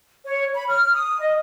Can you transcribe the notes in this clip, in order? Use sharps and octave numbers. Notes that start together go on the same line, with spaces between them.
C#5
B5
F6
D#6
D#5